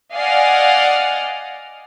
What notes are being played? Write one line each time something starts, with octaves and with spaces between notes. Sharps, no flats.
D5 D#5 F5 F#5 G#5